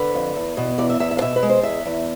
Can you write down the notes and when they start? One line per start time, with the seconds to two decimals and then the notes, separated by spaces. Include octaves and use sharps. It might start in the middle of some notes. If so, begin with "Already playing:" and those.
Already playing: D3 B4
0.14 F2
0.36 E2
0.57 B2
0.78 E2 D5
0.90 E5
1.00 E2 E5
1.11 E5
1.17 F5
1.21 B2 E5
1.36 B4
1.43 G#3
1.49 C5
1.63 E2 E5
1.85 E2